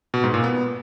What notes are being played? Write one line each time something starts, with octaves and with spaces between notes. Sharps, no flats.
B2
G#2
A#2
B3